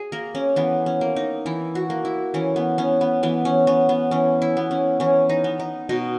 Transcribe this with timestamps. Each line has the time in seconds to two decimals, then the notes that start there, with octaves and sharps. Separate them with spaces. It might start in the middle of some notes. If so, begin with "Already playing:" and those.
Already playing: G#4
0.12 A#3 A#4
0.35 C#4
0.56 E3 B3
0.86 C#4
1.01 A#3
1.16 D#4
1.46 E3 E4
1.75 F#4
1.90 A#3
2.05 E4
2.34 E3 C#4
2.56 B3
2.78 B3 C#4
3.01 B3
3.23 E3 B3
3.45 C#4
3.67 B3 C#4
3.89 B3
4.11 E3 C#4
4.42 E4
4.57 B3
4.71 C#4
5.00 E3 C#4
5.29 D#4
5.44 B3
5.60 D#4
5.89 B2 D#4